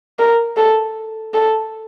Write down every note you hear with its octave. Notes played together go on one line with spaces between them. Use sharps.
A#4
A4
A4